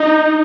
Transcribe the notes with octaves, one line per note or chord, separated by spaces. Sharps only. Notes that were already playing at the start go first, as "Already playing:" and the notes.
Already playing: D#4